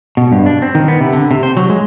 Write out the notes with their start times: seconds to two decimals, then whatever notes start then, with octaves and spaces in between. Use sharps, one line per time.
0.17 B2
0.32 G2
0.46 D4
0.62 C4
0.75 D#3
0.88 B3
1.01 C3
1.13 D3
1.31 C3
1.43 C5
1.57 F#3
1.70 G#3